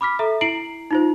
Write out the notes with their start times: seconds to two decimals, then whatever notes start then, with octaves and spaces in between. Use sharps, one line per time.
0.01 B5 D6 F6 B6
0.19 A4 E5 A#5
0.41 E4 A#5 C7 D7 F#7
0.91 D#4 F4 C5